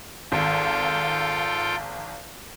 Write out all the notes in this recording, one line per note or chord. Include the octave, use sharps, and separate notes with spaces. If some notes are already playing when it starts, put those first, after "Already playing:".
G#1 F4 A4 G5